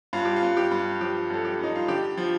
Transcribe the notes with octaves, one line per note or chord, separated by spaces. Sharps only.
G2 F4
G4
F4
G2
G4
G2
F3 G4
G2 A4
G4
G2 D#4
F4
D3 G4
F3